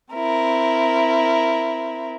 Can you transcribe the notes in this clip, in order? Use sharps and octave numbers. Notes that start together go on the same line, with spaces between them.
C4 E4 A#4